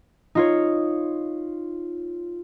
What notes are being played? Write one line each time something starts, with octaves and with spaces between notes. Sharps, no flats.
D#4 F4 C#5